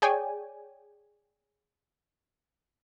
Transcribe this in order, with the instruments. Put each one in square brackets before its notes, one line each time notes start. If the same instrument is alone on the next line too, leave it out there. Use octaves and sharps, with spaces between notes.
[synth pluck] G#4 C#5 D5 G5 G#5